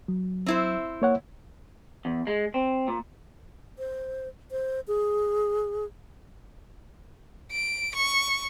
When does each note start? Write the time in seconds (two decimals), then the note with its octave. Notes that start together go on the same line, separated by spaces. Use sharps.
0.08 F#3
0.46 C4 E4 C5
1.02 A#3 C#5 F#5
2.05 E2
2.27 G#3
2.54 C4
2.88 A#2
3.78 C5
4.51 C5
4.88 G#4
7.52 D7
7.95 C#6